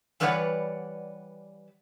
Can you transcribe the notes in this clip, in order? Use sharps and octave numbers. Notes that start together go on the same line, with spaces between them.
E3 G3 B4 C#5 D5 F#5